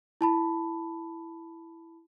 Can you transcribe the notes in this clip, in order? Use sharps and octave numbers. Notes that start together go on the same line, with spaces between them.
E4 A5 B5